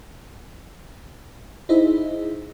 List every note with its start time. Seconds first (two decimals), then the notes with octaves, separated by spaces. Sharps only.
1.69 D#4 E4 G#4 C5 D#5 E5